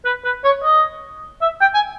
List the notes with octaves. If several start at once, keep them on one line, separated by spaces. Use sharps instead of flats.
B4
B4
C#5
D#5
E5
G5
G#5